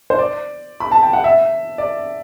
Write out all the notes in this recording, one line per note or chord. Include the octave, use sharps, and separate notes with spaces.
C5
D5
B5
A5
G5
F#5
E5
D5